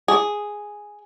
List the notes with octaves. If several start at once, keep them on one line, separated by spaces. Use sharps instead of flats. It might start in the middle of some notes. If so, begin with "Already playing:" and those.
G#4